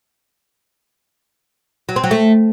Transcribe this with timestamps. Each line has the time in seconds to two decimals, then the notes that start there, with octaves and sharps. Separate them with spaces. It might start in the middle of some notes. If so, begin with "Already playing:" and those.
1.89 F#3
1.96 C4
2.04 F#3
2.11 A3